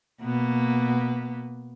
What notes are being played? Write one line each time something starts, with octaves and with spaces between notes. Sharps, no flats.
B2 A#3 B3